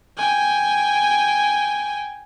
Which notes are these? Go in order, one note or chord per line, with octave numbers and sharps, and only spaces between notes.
G5 G#5